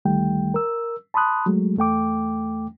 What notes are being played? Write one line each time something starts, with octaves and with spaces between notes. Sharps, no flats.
D2 D#3 G3 A3 G5
A#4 E6
A5 B5 C6 D#6 F#6
F#3 G#3 A3
E2 A3 G5 D6